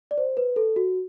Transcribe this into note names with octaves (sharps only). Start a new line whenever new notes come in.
D5
C5
B4
A4
F#4